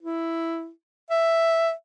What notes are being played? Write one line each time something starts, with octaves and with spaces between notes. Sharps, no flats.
E4
E5